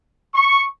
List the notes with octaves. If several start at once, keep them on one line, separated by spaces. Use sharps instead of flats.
C#6